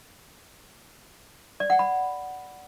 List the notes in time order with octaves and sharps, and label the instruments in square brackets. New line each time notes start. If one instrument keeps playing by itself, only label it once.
[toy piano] D5
F#5
B5